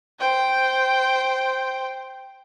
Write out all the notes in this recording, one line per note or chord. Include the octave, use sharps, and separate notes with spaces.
C5 G5